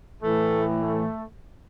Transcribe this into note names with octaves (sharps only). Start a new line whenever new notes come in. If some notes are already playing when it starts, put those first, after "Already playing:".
A2 E3 A3
A3